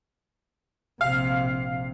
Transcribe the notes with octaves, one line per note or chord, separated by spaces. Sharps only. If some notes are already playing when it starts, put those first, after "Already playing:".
A#1 C3 F5